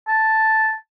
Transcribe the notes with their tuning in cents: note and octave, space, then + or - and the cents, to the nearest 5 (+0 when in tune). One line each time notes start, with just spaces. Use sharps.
A5 +0